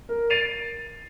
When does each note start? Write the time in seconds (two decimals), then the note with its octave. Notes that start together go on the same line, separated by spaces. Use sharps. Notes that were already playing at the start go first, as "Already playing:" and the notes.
0.09 A#4
0.30 A6 C7 D7 D#7 F7